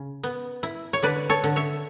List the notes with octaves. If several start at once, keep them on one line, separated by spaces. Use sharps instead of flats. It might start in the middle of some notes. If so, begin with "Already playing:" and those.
Already playing: C#3
B3
E4
C#5
D3 B4 D5
A4 C#5
D3
C#5 E5